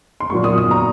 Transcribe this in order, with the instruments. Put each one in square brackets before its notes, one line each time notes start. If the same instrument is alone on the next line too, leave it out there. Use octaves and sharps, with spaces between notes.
[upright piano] C6
A#2 F#3 A#3 C#6
D#6
D#6
A#5